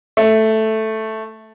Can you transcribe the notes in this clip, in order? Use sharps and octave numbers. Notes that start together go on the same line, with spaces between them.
A3